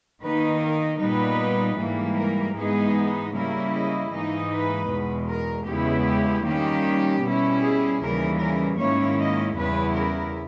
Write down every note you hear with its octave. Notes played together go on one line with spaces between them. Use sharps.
D#3 A#3 D#4 B4
A#4
A#2 G3 B3 D#4 B4
G#2 E3 G3 A#3
A#4
G#2 E3 G#3 B3 D#4 G#4
C#3 G3 A#3 E4 A#4
D#5
G#2 E3 A#3 D#4 D#5
B4
E2 B2 G#3
A#4
E2 C#3 G#3 B3 E4 G4
G4
D#3 G3 A#3 C#4 G4
B2 G3 C#4 E4
G#4
D#2 C#3 E3 G3 A#4
A#4
G#2 D#3 A#3 C#4 E4 C#5
D#5
E2 C#3 G3 B3 E4 B4
A#4